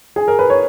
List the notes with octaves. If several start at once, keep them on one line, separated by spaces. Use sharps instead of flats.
G#4
A#4
B4
C#5